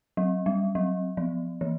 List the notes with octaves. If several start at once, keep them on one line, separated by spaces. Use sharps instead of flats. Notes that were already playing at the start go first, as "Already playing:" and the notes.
F#3
G3
F#3
F3
E3